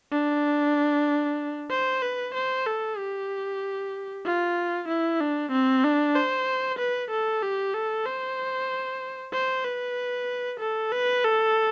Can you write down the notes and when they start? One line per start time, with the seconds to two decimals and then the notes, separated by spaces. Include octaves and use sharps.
0.11 D4
1.70 C5
2.02 B4
2.34 C5
2.66 A4
2.97 G4
4.25 F4
4.88 E4
5.20 D4
5.52 C4
5.84 D4
6.15 C5
6.78 B4
7.11 A4
7.42 G4
7.74 A4
8.05 C5
9.33 C5
9.64 B4
10.60 A4
10.92 B4
11.24 A4